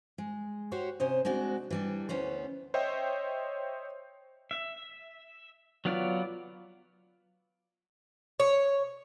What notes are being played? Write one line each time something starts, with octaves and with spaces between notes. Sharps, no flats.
G#3
F#4 G4 C5 C#5
C3 C#4 C5 D#5
G#3 C4 D4 F#4
E3 G3 D4
D2 B3 C#4 C5
C5 C#5 D#5 E5 G5
E5
F#3 B3 F4 D5
C#5